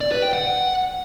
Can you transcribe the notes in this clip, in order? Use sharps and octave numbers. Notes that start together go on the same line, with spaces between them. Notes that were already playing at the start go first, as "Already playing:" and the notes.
D5
B4
G5
F#5